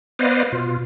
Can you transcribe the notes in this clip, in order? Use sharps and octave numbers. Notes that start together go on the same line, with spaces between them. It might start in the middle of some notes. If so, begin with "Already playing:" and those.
B3 B4 C5 D5 D#5 F5
B2 F4